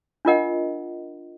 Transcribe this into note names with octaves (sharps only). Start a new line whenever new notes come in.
D4 F4 A#4 D#5 F#5